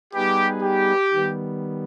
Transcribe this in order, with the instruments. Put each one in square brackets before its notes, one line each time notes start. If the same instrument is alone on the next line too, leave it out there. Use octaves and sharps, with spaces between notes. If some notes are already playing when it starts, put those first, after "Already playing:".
[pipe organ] G3 B3 D#4 G#4 B4 [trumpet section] G4
[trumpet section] G4
[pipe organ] D#3 G3 B3